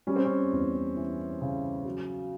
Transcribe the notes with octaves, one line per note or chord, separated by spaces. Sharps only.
G3 C#4
C4
C#4
E2
E3
C#3
F#3